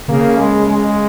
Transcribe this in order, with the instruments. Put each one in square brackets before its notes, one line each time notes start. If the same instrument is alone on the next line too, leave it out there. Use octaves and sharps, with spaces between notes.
[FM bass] C#3 [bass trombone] A#3
[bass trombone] G#3
G#3